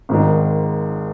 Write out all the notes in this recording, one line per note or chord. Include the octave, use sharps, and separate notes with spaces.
G#1 G#2 D#3